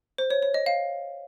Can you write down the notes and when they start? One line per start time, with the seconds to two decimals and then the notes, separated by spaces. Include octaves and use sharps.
0.18 C5
0.30 C#5
0.42 C#5
0.54 D#5
0.66 F5